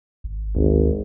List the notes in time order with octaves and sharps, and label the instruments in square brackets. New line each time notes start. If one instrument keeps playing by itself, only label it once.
[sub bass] G#1
[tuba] G#1 [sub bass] D2